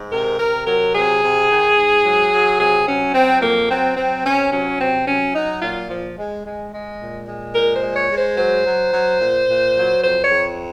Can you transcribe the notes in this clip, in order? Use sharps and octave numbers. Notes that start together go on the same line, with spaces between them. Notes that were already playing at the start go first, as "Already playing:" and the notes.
Already playing: G#2
C3 A#4
C3 A#4
F#3 A#4
C3 G#4
C3
D#3
G#2
F#3
F#3
C3 G#4
F#3 C#4
F#3 C4
F2 A#3
F#3 C4
F#3 C4
C3 C#4
F#3 C#4
C3 C4
F#3 C#4
F#3 D#4
A#2 F4
F3
G#3
G#3
G#3
A#2
G#3
A#2 A#4
C5
G#3
C#5
G#3
C5
F#3 C5
F#3
F#3
A#2
A#2
F#3
F2 C5
C#5
F2